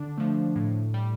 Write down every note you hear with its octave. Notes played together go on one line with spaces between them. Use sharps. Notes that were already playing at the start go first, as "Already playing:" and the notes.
Already playing: D3 D4
F3 A3
A2
G3